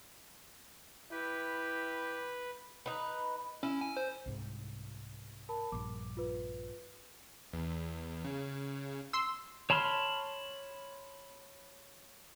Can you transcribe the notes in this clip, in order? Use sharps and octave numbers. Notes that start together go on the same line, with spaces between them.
E4 G4 B4
D#4 B4
C#4 E4
G#5
C5
C2 G#2
A#4 A5 B5
A#1 G2 D6
F4 B4
E2
C#3
C6 E6
C#5 A5 B5 C6 F6